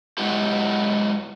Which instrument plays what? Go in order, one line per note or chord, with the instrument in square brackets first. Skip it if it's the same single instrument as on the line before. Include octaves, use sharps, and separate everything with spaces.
[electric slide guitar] F#3 G#3 B3 E4 G4